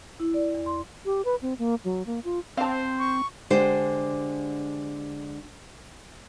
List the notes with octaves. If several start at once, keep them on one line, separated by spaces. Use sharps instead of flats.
E4
D5
E2
C6
G4
B4
C4
A#3
F#3
A#3
F4
C4 C5 F5 A5
C#6
D3 G#3 D4 G4 C5